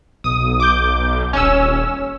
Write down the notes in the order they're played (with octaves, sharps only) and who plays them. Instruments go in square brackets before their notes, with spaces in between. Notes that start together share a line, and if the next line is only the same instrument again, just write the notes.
[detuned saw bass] B1 [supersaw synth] D#6
[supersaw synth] D6 G6
[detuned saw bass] D#1 [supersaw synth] C#4 E6